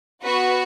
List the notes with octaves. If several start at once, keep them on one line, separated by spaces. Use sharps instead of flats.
B3 F#4 B4